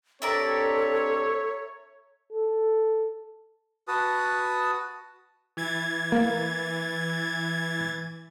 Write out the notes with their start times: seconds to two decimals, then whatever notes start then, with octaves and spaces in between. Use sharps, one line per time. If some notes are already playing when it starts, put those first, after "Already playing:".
0.22 C4 D4 G4 A4 A#4 C#5 D5 E5
2.32 A4
3.88 F#4 B4 A5 D#6
5.57 E3 G#6 A6
6.12 A#3